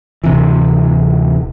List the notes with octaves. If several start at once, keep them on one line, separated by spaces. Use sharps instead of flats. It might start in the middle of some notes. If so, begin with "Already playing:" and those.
D1 C3 E3